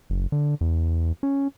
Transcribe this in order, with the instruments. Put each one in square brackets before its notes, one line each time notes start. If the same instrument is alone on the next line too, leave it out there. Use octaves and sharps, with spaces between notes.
[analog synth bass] F#1
D3
E2
C#4